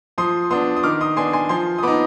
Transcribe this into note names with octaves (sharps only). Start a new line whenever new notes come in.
F3 C6 D#6
B3 D4 C6 D#6
D#6
D#3 D6 F6
C6 D#6
B3 D4 G#5 C6
G#5 C6
F3 G#5 C6
D#6
B3 D#4 B5 D6